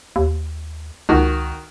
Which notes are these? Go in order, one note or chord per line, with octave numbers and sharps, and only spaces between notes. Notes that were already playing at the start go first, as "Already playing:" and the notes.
D#2
C#2 D#3 F#4